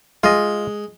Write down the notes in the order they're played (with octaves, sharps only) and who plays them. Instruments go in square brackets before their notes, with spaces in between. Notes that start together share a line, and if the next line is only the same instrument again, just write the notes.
[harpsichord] G#3 [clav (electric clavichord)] F4 D#5